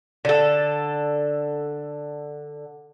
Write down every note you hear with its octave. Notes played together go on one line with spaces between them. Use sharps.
D3 A4